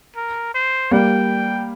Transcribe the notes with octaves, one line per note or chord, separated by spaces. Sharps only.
A#4
C5
G3 A#3 G5